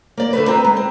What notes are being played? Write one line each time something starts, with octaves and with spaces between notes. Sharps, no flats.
A#3 D5
D3 A3 B4
C4 D#4 B4 A#5
G#3
C4